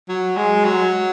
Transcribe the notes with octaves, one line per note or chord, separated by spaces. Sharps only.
F#3
G#3
F#3